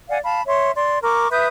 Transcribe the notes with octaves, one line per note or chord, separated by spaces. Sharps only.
D5 F5 F#5 G#5
F5 A5 B5
C#5 E5 C6
D5 C6
A#4 C#6 D6
B4 E5 D#6 G6